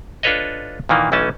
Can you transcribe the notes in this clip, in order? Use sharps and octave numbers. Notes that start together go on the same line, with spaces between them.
D4 F4 A4 B4 C#5 D#5
A#2 D#3 E3 A#3
B1 E3 A3 C#4 A5